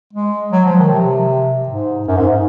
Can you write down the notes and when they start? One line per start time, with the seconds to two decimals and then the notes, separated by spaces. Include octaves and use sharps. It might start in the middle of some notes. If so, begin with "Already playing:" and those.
0.13 G#3
0.52 F#3
0.65 F3
0.78 D#3
0.91 C3
1.69 G#2
2.08 F#2
2.17 G#2